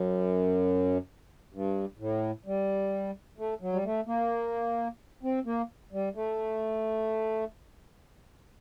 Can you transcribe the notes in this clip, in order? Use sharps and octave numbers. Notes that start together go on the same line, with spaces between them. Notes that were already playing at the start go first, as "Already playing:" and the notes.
Already playing: F#2
G2
A2
G3
A3
F#3
G3
A3
A#3
C4
A#3
G3
A3